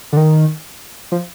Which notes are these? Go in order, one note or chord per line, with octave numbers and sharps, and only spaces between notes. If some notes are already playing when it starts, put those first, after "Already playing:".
D3
D#3
F3